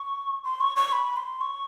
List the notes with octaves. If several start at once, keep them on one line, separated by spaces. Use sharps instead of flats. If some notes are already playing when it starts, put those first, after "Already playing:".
Already playing: C#6
C6
C#6
C#6
B5
C6
C#6